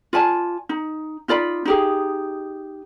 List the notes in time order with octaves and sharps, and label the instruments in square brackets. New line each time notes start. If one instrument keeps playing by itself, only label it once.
[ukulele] F4 D5 G#5 A5
D#4
D#4 F4 D5 B5
D#4 G4 G#4